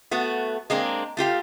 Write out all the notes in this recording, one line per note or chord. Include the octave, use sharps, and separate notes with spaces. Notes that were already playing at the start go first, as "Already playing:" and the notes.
A3 B3 F#4
G#3 A#3 C4 D4
A3 F4 G4 F5